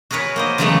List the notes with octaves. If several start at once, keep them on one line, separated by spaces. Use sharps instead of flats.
F#4 G#4 A#4 B4 C#5
A#3 C5 D#5
C#3 E3 F#3 G#3 A3 B3